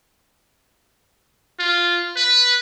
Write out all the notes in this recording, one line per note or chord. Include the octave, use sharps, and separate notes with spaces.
F4
B4